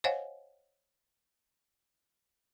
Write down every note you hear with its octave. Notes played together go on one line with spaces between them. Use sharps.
C5 C#5 D#5 F5 F#5 G#5